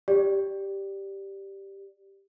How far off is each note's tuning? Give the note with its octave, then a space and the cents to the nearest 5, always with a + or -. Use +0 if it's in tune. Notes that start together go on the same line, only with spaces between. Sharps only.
G4 +0 D5 +0